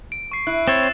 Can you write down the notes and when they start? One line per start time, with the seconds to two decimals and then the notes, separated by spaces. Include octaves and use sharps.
0.12 D7
0.31 C#6 C7
0.47 E4 F#6
0.68 C4 C#5 E6 A6 E7